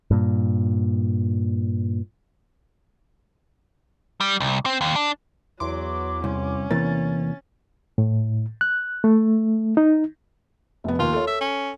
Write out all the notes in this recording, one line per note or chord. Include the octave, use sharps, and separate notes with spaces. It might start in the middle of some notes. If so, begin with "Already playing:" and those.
G2 A#2
G3
C2
C4
D#2
D4
E2 F#3 C6 D6
C2 C#4
E2 C3 E3 A#3 A6
A2
F#6
A3
D#4
F1 B3
D#2 F4
A4 C#5
E5
C#4